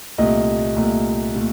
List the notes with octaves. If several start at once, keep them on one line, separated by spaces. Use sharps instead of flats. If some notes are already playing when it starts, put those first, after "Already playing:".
C2 A#2 A3 D#5
C2 A#2 A3
A#2 A3